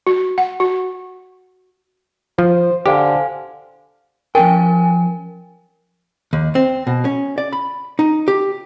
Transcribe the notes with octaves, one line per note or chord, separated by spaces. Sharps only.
F#4
F#5
F#4
F3 C5
D3 G4 C5 F5 G#5
F3 C#4 A#4 G5 G#5
D#2
C4
B2
C#4
D5
B5
D#4
G4